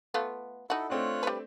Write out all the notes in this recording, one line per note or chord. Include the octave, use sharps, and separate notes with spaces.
A3 B3 F4
D#4 E4 F#4 A4
A3 C4 D4 F4 C#5 F#6
G3 B4